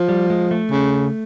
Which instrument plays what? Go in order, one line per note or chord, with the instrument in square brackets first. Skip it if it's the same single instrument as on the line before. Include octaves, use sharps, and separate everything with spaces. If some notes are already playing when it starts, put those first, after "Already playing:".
Already playing: [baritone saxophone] F3
[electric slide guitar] G3
G#3
A3
[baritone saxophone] C#3